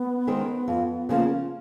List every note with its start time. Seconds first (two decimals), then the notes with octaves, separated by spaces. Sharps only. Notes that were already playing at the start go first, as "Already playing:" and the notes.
Already playing: B3
0.27 D#3 G#3 C4
0.68 F2
1.09 C#3 F3 A#3